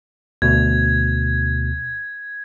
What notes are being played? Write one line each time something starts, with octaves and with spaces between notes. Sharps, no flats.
D2 B2 G#6